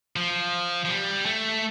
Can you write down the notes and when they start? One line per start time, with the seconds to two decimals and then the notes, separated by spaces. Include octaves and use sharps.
0.16 F3
0.85 F3
0.89 G3
1.26 A3